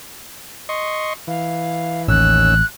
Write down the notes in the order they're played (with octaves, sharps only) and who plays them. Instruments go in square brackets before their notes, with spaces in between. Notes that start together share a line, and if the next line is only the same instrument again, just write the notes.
[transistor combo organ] D#5 C6 C#6
[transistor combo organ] E3 [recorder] F5
[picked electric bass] A1 [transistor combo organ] D#2 C#4 E6 [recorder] F#6